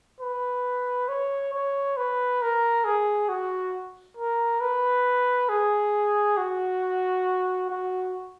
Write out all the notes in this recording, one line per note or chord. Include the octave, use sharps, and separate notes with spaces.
B4
C#5
C#5
B4
A#4
G#4
F#4
A#4
B4
G#4
F#4
F#4